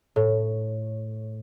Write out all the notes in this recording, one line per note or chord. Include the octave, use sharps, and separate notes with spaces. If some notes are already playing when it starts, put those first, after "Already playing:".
A2